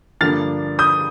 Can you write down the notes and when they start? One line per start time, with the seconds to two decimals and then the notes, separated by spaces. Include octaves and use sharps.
0.21 G2 D3 F3 A#3 D4 F6 A6
0.79 D#6 G6